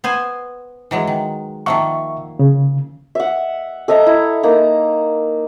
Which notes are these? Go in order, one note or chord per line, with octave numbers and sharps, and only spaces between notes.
B3 C5 G#5
E3 F#3 G#3
D#3
D#3 F3 A#3 E5 F#5 C#6
C#3
E5 F#5
A4 D#5 E5 A#5
E4
A#3 D#4 A#5